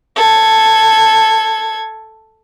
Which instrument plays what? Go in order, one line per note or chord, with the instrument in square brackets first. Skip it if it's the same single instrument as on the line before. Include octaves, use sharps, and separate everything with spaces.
[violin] A4 G#6